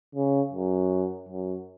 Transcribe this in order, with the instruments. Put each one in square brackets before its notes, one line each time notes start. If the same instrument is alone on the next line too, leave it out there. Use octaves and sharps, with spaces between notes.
[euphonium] C#3
F#2
F#2